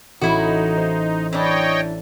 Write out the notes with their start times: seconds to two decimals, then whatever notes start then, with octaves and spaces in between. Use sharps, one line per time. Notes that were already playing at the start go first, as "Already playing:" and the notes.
0.21 A1 D#4 E4 F#4
0.77 C5
1.33 E3 D4 C#5 D#5 G5